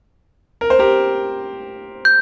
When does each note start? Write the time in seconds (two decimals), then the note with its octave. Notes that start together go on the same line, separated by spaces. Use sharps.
0.61 A#4
0.70 C5
0.79 G4 A#4
2.05 G6